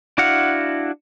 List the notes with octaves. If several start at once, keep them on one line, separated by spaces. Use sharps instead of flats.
D4 E4 F#4 F5 F#5